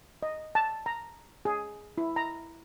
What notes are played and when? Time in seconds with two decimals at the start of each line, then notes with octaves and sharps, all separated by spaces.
0.23 D#5
0.55 A5
0.86 A#5
1.45 G#4
1.98 E4
2.16 A#5